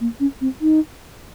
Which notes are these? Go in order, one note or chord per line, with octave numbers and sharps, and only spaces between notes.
A#3
C#4
C4
D#4